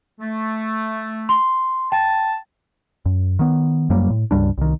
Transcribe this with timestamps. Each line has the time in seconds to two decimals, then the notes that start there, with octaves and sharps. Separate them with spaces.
0.21 A3
1.29 C6
1.92 G5 A5
3.06 F#2
3.39 D#3 B3
3.90 F#2 F#3 G3 A#3
4.10 A2
4.31 C#2 G2 G3 D4
4.58 C2 D#3